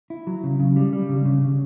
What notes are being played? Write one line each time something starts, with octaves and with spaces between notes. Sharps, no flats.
E4
F#3
C#3
C#3
G3
G3
C#3
C#3
C#3